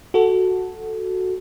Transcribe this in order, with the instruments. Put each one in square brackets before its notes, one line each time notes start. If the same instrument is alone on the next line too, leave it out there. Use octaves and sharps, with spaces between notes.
[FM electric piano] F#4 A4